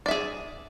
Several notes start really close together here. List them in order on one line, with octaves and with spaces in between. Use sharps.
D5 E5 G#4